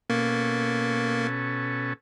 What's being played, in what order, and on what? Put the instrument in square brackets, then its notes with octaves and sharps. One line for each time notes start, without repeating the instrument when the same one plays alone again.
[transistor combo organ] B2 C#4 A4 [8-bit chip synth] A#3